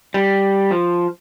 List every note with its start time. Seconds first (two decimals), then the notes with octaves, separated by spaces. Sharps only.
0.14 G3
0.71 F3